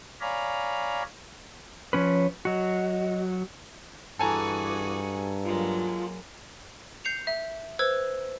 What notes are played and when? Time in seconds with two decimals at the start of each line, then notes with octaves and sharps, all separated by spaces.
0.21 C#5 D5 F5 G#5 A#5 B5
1.93 F3 C#4 B4 C#5
2.45 F#3 F#4 D#5
4.19 G2 E3 F#4 G#4 A4 G#5 A#5
5.44 F#3 G#3 A#3 F4
7.05 G6 C7 C#7 F7
7.27 E5
7.79 B4 C5 E6 G#6